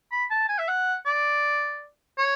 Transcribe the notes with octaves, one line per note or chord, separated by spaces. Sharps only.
B5
A5
G#5
E5
F#5
D5
C#5